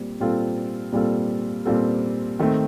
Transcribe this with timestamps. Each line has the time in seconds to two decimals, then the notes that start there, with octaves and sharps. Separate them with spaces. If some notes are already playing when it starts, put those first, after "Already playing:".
Already playing: A#2 G3 C4
0.20 A#2 G3 C4 F4 A4
0.92 A#2 G3 C4 F4 A4
1.65 A#2 G3 C4 F4 A4
2.39 D#3 A3 C4